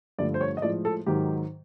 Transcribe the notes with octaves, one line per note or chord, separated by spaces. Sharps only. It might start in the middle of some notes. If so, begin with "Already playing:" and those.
G2 D3 F3 A3 D5
C5
C#5
D#5
A2 F3 G#3 D5
A4
G#2 D#3 F#3 G4